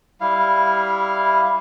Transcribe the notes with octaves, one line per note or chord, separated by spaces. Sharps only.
G3 E4 F5